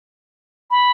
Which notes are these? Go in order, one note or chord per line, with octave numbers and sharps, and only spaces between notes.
B5